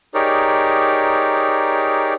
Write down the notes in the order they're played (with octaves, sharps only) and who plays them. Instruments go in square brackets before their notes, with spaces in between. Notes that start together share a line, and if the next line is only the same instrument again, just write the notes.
[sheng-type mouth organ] D#4 G4 G#4 A#4 C#5 D5